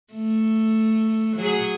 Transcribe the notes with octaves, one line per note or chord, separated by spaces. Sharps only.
A3
F#3 G#4